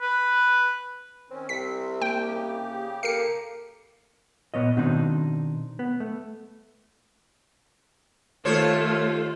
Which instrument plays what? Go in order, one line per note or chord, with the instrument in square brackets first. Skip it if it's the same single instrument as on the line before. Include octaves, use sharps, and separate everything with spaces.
[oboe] B4
[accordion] D#3 C#4 [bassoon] C4
[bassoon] C2 [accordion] C3 C4 [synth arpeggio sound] B6
[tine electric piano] A#3 [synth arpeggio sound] G5
[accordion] C#3 G4
[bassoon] A#3 [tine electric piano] A4 A#4 F5 [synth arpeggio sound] C7 C#7
[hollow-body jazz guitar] A#2 B3 C#5 D#5
B2 D#3 B3 C4 D4 D#4
B3
A3
[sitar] D#2 C5 C#5 [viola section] A3 F4